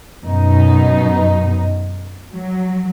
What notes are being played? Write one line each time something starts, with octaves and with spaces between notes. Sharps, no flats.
F#2 B2 F#3 D#4
F#3